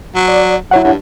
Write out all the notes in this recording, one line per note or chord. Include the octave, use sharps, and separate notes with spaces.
F#3
D5
F#3 E4 C#5 F#5
G2